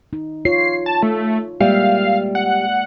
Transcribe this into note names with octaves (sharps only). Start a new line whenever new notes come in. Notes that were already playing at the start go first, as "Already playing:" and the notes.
D#4
F4 C#5 C7
A5
A3
G3 G#3 A#3 E5 F5
F#5